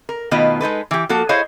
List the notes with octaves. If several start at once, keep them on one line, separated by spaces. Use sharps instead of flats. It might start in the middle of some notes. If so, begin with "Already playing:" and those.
A#4
B2 D#3 A3 B3 F4 D#5
G#3 D#4 A4 B4
E3 G4
F3 A#3 F#4 A4
E4 G#4 C5 C#5 D#5 F5